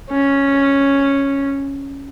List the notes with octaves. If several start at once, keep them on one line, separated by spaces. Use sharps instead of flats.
C#4